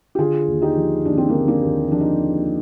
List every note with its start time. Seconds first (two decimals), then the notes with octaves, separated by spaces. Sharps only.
0.15 G4
0.18 D3 F4 G#4
0.47 D#2
0.62 D#4 G4
0.77 F3
1.05 D#2 D4
1.17 C4
1.29 D3 A#3 D4
1.48 A#3 D4
1.63 D#2
1.91 F3 D4
2.01 D#4